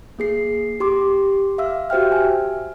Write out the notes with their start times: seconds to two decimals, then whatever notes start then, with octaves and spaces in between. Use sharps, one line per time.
0.19 A#3 G#4 C7
0.80 G4 C6 D6
1.58 E5 F5 E6
1.90 F#4 G4 C5 E5 G5 F6
2.12 G#5